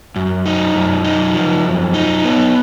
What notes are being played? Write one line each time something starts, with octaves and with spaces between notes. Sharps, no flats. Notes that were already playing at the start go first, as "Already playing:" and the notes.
F#2
D#4
F#2
D#4
F3
F#2
D#4
B3